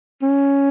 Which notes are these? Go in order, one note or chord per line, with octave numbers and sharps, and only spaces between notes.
C#4